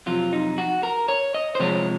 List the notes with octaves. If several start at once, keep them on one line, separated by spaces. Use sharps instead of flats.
F2 C3 F#3 F4
D#4
F#4
A#4
C#5
D#5
C5
C3 F3 G#3 C#5